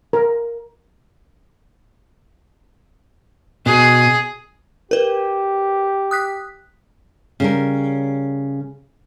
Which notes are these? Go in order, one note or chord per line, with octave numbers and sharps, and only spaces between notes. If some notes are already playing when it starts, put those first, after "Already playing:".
A#4
B2 G#4
G4 A#4 B4
D#6 F#6 B6
C#3 G3 A#4